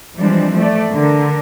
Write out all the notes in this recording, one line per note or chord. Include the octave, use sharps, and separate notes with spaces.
E3 F3 G3 G#3 C4 D4
A3 D5
D3 A#4